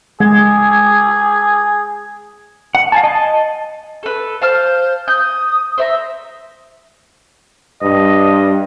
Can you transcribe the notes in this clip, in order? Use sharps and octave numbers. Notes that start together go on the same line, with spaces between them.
G#3 G#4 G#6
F#5
F5 G#5 A5
D#5 A5
A4 B4
C5 F5 A5 F6
D#6 G6
C5 E5 A#5
G2 D#5